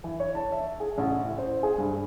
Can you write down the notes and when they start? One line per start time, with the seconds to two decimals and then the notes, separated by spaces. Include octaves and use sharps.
0.04 E3
0.20 C#5
0.35 A5
0.52 E5
0.80 G#4
0.98 A1
1.24 A2
1.38 C5
1.63 G#4
1.78 G2